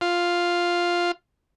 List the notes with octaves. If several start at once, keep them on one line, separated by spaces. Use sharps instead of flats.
F4